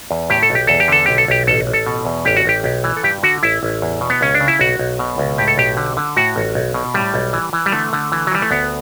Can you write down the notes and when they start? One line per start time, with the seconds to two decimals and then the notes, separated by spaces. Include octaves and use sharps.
0.11 E2
0.30 A2 G4
0.43 A4
0.50 B1 G4
0.67 E2 A4
0.80 G4
0.88 D3 A4
1.06 B1 G4
1.18 A4
1.28 B1 G4
1.47 A1 A4
1.67 A1
1.73 A4
1.86 B2
2.05 E2
2.25 A1 G4
2.37 F#4
2.45 A1 G4
2.64 B1
2.84 E3
2.97 A4
3.03 G2 G4
3.23 D3 F#4
3.43 A1 E4
3.63 A1
3.82 E2
4.01 B2
4.10 B3
4.21 C#2 C#4
4.35 D4
4.40 C#3
4.48 E4
4.59 B1 F#4
4.79 B1
4.99 B2
5.18 C#2
5.38 A2 G4
5.48 A4
5.58 B1 G4
5.77 D3
5.97 D3
6.16 A2 F#4
6.36 A1
6.55 B1
6.74 B2
6.94 A2 G3
7.14 B1
7.33 E3
7.53 E3
7.66 G3
7.72 D3 A3
7.93 D3
8.12 E3
8.27 F#3
8.32 E3 G3
8.42 A3
8.51 D2 B3